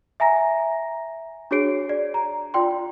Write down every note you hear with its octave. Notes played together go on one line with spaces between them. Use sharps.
E5 G#5 A#5 A#6
D4 F#4 G#4 C#5 C7 D7
D5
A#5
F4 D5 G5 C6